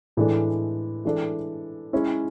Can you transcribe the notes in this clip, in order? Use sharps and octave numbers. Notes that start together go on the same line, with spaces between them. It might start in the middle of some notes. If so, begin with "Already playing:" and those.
A2 E3 G#3 D4 A4
E3 G#3 D4 A4
G#3 C#4 E4